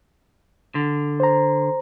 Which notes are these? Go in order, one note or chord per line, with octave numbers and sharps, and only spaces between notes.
D3
C5 A#5